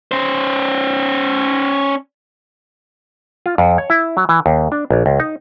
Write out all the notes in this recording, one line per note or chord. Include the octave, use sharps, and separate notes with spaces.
C#4 C5
F4
F2
C#5
E4
F#3
E3
D#2
D4
A#1
C#2
D#4